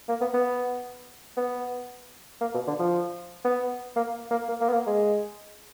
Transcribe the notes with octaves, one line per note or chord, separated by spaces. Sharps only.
A#3
B3
B3
B3
A#3
B2
D3
F3
B3
A#3
A#3
A#3
A#3
B3
A#3
G#3